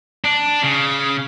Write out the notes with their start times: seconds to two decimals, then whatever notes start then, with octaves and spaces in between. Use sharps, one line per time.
0.25 D4
0.64 C#3